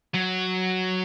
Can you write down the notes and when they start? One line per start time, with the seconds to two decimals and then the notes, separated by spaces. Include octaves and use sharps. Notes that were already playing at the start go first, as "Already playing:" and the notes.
0.14 F#3